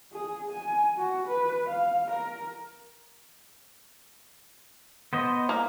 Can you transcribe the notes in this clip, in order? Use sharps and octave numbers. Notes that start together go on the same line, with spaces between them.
G#4
G#5
F#4
B4
F5
A#4
B3 C5 D#5
A#3